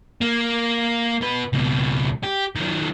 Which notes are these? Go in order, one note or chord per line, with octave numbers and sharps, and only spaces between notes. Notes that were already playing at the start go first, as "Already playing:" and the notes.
A#3
B2 B4
C#2 B2
G4
D#3 F#3